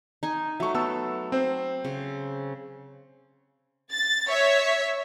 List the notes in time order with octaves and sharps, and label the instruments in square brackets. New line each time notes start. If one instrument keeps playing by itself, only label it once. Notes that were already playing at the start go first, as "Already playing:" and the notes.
[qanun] D#4 G#5
[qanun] F#3 A3 [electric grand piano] E5 C#6
[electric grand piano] B3 A5 E6 [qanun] A4
[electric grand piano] C4 C5
[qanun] C#3
[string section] A6
C#5 E5